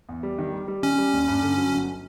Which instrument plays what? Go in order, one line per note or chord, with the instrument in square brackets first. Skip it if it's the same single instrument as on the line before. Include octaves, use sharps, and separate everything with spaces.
[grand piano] E2
G3
D#3
G3
G3
[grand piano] D#3 [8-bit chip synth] C#4
[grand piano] G3
D#2
G2
D3
F#3
G1